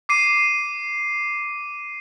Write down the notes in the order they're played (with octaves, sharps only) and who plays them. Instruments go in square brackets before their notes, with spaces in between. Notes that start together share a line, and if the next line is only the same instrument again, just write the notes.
[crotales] D6 C7 D#7